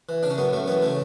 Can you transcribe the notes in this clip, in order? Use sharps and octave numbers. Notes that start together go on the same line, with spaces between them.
E3
C#3 D4
C#4
F#2 B3
F#2 A3
E3 B3
C#3 A3